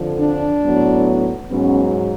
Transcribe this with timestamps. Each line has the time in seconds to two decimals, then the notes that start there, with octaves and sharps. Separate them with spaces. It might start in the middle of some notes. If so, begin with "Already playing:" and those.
Already playing: F2 D3 F3
0.20 D4
0.63 A2 F#3 B3
1.50 G#2 F#3 B3 C#4